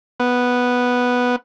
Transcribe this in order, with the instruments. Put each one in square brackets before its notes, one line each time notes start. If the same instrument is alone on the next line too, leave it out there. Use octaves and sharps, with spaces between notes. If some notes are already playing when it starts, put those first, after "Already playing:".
[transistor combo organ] B3